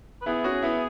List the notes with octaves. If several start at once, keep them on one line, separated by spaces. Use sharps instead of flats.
B4
B3 E4 G#4
C#4 F#4
B3 E4